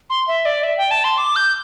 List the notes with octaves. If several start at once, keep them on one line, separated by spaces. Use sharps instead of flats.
C6
E5
D5
E5
G5
A5
C6
D6
G6